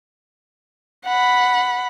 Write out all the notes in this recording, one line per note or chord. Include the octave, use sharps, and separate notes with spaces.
F#5 B5